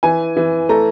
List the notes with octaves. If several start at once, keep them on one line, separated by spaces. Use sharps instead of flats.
E3 G#5
E3
A3 A#5